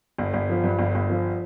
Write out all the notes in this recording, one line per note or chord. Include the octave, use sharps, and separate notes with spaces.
G1
G1
F3
G2
G1
G1
F3